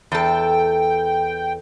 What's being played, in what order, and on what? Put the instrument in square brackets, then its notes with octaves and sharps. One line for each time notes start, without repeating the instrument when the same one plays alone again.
[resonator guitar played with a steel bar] E2 A4 [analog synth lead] G5